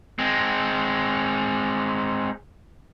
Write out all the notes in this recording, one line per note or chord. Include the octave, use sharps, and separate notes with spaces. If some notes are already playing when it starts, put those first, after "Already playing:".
G#3 C4